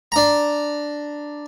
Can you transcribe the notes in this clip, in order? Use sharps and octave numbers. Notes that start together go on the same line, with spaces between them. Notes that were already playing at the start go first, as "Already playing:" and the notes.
D4 A#5